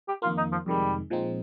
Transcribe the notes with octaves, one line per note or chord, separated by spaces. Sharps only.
G4
F2 D#3 A#3 F4
D#4
F3
F2 C3 D#3 G3 G#3
A#2 F3 G#3 C4 D#4